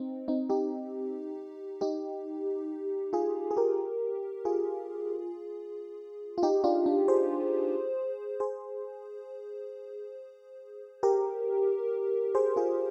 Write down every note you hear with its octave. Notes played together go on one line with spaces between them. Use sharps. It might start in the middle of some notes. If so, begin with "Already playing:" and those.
Already playing: C4 D#4
C4 D#4
D#4 G4
D#4 G4
F4 G#4
G#4
G4 A#4
F4 G#4
F4
D#4 G4
D4 F4
D4
G#4 C5
G#4 C5
G4 A#4
G#4 C5
F4 G#4